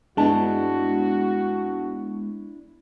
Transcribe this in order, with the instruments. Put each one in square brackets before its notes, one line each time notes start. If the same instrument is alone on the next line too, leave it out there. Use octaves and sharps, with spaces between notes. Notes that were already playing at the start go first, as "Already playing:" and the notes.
[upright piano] G2 A5 [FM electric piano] G#3 B3 [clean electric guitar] D4 E4 [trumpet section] F#4